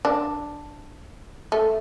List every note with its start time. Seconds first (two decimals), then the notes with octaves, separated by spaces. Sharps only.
0.05 D4
1.52 A3